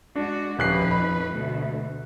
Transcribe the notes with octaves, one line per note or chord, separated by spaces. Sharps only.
G#3 D4 F#4
D#1 F2 D#4 B4 F#6 C7
B5
D2 B2 A3